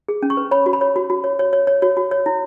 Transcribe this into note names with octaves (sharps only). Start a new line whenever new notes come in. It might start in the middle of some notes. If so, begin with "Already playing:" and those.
G#4
C#4
C#6
B4
C#5 B5
F#4
B5
C#5
F#4
F#4
C#5
C#5
C#5
C#5
F#4 C#5
F#4
C#5
E4